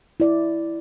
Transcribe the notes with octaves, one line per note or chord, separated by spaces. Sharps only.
E4 D5